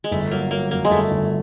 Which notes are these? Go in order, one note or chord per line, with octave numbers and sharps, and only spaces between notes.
G#3
G1 A3
F#3 A#3
F#3 A#3
F#2 A#3
G#3
G1 A3
G1